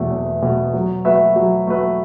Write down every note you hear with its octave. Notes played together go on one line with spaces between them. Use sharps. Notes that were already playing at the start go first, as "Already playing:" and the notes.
Already playing: E2 B2 A3
E2
B2 A3
F#3
A3 F#4 B4 E5
F#3
A3 F#4 B4 E5